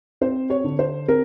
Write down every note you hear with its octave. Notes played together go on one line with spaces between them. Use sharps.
C4 C5
C#5
D3
C5
C4 A#4